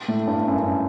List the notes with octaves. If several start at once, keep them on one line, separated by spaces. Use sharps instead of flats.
A2
G2
F#2